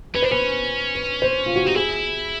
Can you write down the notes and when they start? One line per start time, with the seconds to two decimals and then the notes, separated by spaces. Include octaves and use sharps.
0.15 C#4 B4
0.22 D4 C5
0.31 C#4 B4
0.95 B4
1.22 C5
1.46 F4
1.56 F#4
1.65 D#4 G4
1.75 E4 G#4